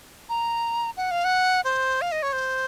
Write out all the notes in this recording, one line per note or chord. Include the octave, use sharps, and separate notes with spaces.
A#5
F#5
F5
F#5
C5
F5
D#5
C#5
C5